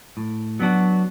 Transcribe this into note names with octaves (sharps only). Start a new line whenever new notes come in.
A2
F#3 B3 D4 F#4